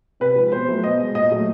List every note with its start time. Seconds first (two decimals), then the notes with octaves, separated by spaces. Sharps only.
0.20 C3 B4
0.36 F3 G#3
0.52 B2 C5
0.68 F#3 A3
0.84 B2 D#5
0.99 G#3
1.15 A#2 D#5
1.31 F#3 A3